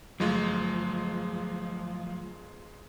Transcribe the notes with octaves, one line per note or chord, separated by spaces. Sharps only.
G1 F3 F#3 G#3 A3 F4